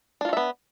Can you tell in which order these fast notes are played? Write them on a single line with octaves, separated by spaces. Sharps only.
D4 F4 F#4 E5 B3